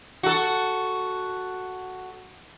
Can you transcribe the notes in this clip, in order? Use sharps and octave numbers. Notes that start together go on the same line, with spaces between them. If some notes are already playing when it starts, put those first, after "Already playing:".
F#4 A4